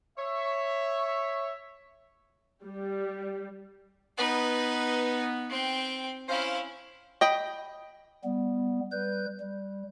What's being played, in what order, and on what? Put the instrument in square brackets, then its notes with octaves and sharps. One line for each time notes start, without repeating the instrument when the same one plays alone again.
[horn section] C#5 E5
[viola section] G3
[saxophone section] B3 [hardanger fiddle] D#4 B4
[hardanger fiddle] C4 G5
[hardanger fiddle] C#4 E4 [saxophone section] C5 F5
[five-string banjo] D#5 G5 B5
[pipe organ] G3 B3
G3 B4 G6
G3